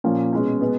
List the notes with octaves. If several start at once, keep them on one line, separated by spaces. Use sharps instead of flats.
A#2 F3 A#3 C#4
B2 G#3 C#4
B2 G#3 B3